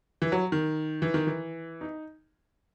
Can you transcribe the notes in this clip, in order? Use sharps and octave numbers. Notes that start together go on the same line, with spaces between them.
E3
F#3
D#3
E3
D#3
E3
D#4